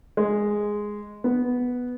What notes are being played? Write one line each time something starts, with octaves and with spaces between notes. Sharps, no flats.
G#3
B3